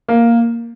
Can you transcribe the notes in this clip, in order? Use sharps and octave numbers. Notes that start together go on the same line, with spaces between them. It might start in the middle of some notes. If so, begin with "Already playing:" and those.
A#3